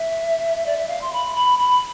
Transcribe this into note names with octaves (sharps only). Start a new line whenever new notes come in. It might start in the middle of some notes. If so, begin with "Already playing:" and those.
Already playing: E5
D5
E5
F5
C6
B5
B5
B5